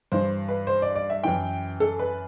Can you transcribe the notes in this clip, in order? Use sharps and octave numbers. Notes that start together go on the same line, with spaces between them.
G2 E3 C5
B4
C5
D5
D5
E5
F#2 E3 G5
A4
B4